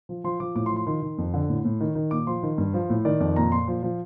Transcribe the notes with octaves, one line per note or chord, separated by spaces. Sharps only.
F3
F3 C6
F3 D6
A2 D6
C6
F3
C6
D#3 C6
D#3
F2
D3
A2
A2
D#3
D#3
A#2 D6
F3 C6
D#3
G2
F3
A2
D#3 D5
F2 D5
A#2 A#5
A#2 C6
F3
F3